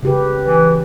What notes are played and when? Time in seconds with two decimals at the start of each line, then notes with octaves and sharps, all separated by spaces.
0.03 C#3 G4 B4
0.42 E3